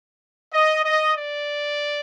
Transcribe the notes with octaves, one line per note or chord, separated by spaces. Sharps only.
D#5
D#5
D5